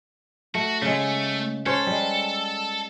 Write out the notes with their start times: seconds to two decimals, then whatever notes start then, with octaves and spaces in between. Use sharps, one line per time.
0.55 A3 F#4
0.82 C#3 G#3 A3
1.66 C#4 A4 C5 C#5
1.87 G3 G#3